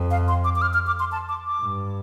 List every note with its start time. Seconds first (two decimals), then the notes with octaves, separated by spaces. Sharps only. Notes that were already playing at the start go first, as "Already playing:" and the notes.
Already playing: F2
0.11 F5
0.28 C6
0.44 D6
0.56 D6
0.62 F6
0.74 F6
0.87 D6
1.00 C6
1.12 A5
1.29 D6
1.45 D6
1.62 G2